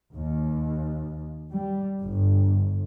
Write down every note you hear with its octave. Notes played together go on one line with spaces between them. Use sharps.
D#2
G3
G1